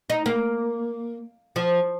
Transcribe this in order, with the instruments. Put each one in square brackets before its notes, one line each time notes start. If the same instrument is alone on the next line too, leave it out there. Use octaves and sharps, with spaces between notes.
[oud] D#4
A#3
F3